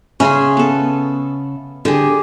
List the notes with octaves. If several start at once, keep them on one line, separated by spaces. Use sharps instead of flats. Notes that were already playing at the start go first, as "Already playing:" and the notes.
C#3 C#4 G#4 E5 C6
B3 A4
D3 G4 G#4